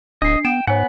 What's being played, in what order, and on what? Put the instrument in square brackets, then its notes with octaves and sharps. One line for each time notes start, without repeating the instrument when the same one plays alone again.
[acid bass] D1 [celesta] D4 C7 [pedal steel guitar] D#5
[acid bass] B3 [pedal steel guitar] G5 [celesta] E7
[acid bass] G#2 [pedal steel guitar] B3 F#5 [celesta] C#5 G#5